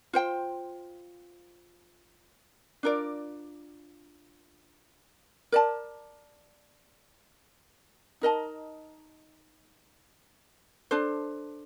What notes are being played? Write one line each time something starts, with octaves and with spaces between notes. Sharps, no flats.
F4 C5 G5
D4 F4 A#4 D5
A#4 D5 A5
D#4 A#4 D#5 A5
D4 A4 C5